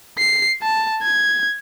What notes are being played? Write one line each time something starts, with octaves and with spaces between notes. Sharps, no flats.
C7
A5
G#6